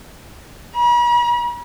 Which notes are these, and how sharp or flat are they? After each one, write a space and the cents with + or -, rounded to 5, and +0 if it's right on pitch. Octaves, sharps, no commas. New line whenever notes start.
B5 -45